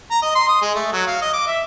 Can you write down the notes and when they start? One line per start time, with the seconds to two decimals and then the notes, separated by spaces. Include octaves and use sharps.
0.11 A#5
0.22 D#5
0.35 C6
0.48 D#6
0.62 G#3
0.75 A3
0.92 F#3
1.07 F5
1.21 D#5
1.33 D6
1.47 E5